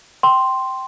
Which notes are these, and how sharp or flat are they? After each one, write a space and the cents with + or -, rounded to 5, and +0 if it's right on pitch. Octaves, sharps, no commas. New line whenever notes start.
G5 -15 C6 +0